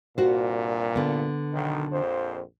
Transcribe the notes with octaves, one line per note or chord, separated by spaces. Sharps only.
C2 G2 A#2 F#4 C5
D3 B3
B1 D#3
A#1 F2 C5